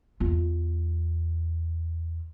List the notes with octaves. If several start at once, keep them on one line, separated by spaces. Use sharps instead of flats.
E2 F4